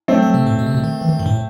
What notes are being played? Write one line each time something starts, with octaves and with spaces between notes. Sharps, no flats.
F#3 A3 C4
F#3
C3
A2
B2
C3
B2
D#3
E3
D#3
G2
A2